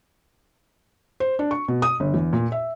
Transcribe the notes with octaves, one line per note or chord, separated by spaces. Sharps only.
C5
D4
C#6
B2
D#6
G1
E2
A#2
E5